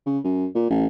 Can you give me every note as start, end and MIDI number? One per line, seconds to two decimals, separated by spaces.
0.06 0.19 49
0.24 0.47 42
0.55 0.69 46
0.70 0.86 33